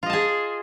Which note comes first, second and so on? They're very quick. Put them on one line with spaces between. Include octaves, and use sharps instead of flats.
F4 D#5 A5 G#4